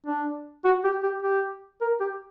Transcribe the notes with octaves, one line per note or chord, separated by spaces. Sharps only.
D4
F#4
G4
G4
G4
A#4
G4